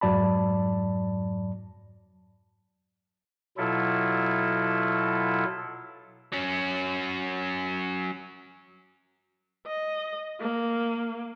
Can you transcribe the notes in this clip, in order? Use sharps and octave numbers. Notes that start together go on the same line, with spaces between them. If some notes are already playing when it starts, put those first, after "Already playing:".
F2 G#2 F#3 D5 A5 B5
B2 F#3 E4 F4 A4
F#3 C#4
D#5
A#3